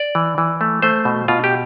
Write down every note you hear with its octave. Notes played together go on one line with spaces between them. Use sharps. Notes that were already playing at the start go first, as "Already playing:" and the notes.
Already playing: D5
E3
E3
A3
A3 C5
B2
B2 F4
G4